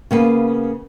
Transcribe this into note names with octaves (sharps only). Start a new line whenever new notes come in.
C#3 A#3 B3